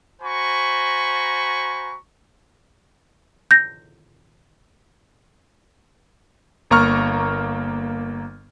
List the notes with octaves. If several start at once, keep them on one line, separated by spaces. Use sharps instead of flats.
F#4 C5 G#5 A#5 B5 C#6
G6 A#6
G1 A#3 A#5 C#6 F6